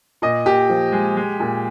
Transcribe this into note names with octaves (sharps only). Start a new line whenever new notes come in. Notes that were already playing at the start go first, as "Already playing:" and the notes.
A#2 D#5
A#2 G4
F3
G#3
G#3
A#2